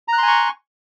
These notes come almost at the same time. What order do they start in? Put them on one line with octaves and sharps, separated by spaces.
A#5 F#6 C6 G#5 C#6